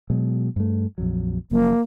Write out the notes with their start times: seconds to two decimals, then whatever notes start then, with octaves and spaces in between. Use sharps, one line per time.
0.10 B2 F#3 G#3
0.56 G2 A3
0.98 A#1 F2 F#3
1.51 F#1 F#2 F3 A#3